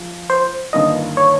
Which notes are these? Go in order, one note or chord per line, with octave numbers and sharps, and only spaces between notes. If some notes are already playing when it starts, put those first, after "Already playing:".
Already playing: F3
C5
G1 G2 D#3 A#3 D#5
C#5